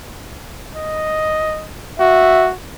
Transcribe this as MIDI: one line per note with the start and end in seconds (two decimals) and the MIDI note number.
0.75 1.66 75
2.00 2.53 66
2.00 2.47 76